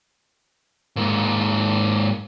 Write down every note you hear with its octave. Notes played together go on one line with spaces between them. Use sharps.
G#2 A#3